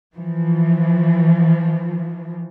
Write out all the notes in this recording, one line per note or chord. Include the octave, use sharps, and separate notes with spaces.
E3 F3